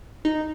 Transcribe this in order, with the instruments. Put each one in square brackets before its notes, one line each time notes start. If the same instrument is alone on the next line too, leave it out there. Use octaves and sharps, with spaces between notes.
[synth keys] D#4